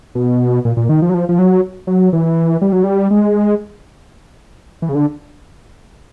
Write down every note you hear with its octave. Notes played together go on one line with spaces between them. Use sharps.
B2
A#2
A#2
D#3
F3
F#3
F3
F3
F#3
F#3
E3
G3
F#3
G3
G#3
E3
C#3
D3